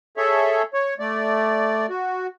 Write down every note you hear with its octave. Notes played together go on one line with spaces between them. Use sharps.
G#4 A4 C#5 E5
C#5
A3 D5
F#4